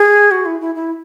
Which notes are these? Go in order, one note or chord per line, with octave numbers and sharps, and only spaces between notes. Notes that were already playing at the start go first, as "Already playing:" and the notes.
Already playing: G#4
F#4
E4
E4
E4